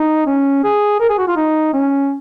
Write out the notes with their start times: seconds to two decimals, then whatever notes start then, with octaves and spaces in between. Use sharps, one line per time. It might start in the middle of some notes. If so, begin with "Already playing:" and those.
Already playing: D#4
0.27 C#4
0.64 G#4
1.00 A#4
1.09 G#4
1.18 F#4
1.28 F4
1.36 D#4
1.73 C#4